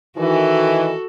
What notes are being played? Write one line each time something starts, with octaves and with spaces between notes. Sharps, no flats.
D#3 E3 F#4 A4